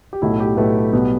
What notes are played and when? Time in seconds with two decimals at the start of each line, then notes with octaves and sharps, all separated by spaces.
0.13 G4
0.22 B1 A2 A3 E4
0.40 G4
0.57 B1 A2 A3 B4
0.93 B1 B2 G3 B3